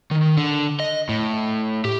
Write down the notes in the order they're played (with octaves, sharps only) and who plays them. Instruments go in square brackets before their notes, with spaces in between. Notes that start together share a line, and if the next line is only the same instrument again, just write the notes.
[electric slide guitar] D#3
D3
D#5
A2
G4